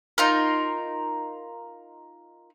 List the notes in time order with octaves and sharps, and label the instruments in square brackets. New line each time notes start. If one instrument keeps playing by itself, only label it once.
[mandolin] D#4 F4 A#4